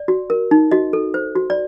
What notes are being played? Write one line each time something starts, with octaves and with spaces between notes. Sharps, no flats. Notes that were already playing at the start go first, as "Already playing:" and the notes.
Already playing: D5
F#4
A#4
D#4
F#4 D#5
A4
C5
F#4
D5